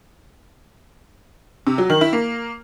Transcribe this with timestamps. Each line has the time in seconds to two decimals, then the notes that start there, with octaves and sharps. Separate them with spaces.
1.67 C3
1.78 F#3
1.90 D#3
2.01 E4
2.13 A#3